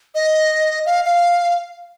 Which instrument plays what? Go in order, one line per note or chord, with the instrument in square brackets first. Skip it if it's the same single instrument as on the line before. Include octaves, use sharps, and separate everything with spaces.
[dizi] D#5
F5
F5